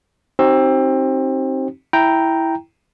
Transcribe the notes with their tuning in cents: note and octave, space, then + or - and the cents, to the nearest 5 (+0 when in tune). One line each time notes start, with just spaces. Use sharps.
C4 +20 D#4 +0 G4 -45
E4 -5 G5 +0 A#5 +0